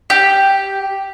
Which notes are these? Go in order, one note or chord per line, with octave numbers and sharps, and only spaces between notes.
G4